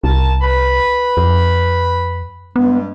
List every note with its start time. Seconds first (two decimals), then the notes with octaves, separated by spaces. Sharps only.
0.04 C2 A#4 A5
0.41 B4 B5
1.17 F2
2.56 G2 G3 G#3 B3